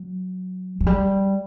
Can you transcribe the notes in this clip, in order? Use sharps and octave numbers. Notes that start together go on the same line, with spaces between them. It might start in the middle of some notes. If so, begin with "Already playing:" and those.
Already playing: F#3
F#3
G3